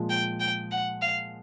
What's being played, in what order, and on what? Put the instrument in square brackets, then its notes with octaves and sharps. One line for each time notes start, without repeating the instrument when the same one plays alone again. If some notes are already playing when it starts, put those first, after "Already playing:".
Already playing: [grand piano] A#2 F3 G#3
[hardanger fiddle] G5
G5
F#5
F5